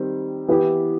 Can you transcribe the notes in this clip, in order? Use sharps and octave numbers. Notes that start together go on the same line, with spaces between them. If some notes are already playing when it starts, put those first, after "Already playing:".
Already playing: D#3 G3 C4
E3 B3 E4 G4